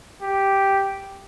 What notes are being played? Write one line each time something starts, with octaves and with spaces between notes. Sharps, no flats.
G4